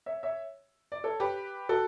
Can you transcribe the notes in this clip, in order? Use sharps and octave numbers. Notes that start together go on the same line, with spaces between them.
C#5 E5
C#5 E5
D5
A4 C#5
G4 B4
F#4 A4